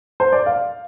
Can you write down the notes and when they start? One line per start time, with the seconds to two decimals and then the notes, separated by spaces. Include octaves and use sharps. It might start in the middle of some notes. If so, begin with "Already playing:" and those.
0.20 C5
0.32 D5
0.46 F5